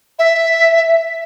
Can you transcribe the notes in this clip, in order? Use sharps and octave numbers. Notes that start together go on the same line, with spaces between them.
E5